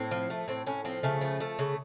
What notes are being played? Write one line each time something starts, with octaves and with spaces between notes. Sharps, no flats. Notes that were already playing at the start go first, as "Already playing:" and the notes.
Already playing: A2 C4
F3
A3
A2 C4
A2 C#4
F3 C4
C#3 A3
F3
A3
C#3